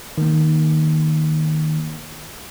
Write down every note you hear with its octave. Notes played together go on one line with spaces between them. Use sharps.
D#3 A#3